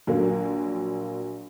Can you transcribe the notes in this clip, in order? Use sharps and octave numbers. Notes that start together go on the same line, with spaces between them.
A#1 F#3 A#3